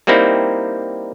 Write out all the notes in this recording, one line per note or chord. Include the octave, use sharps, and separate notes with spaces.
G3 A#3 C4 D#4 E4